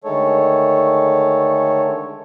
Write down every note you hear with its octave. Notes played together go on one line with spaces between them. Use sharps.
D3 D#3 G#3 A3 A4 C#5